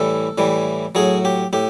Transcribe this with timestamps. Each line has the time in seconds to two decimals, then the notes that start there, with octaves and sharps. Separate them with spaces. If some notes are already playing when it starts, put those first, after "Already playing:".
Already playing: A2 E3 G3 A4
0.38 A2 E3 G3
0.95 A2 F#3 G#4
1.25 G4
1.53 A2 G4